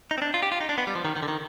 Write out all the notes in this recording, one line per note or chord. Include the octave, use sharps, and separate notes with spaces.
D#4
C4
D4
F4
G4
F4
D#4
D4
B3
G3
F3
D#3
D#3
D3
D#3